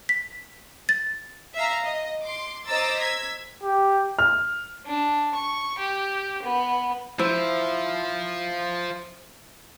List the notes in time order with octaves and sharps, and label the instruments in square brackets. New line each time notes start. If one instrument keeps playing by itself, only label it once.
[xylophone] B6
A6
[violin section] E5 F5 A#5
D#5
C6 D6
C5 D#5 A#5 D6 E6 A6
E6 G#6 B6
[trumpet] G4
[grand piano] F6
[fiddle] D4
C#6
G4
B3
[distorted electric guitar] F3 F4 [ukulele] E4 C5